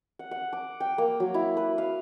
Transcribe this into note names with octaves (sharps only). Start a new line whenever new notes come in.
F#5
F#5
D6
G5
A#3
F#3
E4
B4
F5